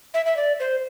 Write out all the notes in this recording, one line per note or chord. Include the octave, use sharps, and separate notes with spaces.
E5
E5
D5
C5